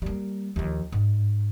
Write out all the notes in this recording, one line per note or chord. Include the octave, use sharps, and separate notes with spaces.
G3 A#3
D#2 F3
G#2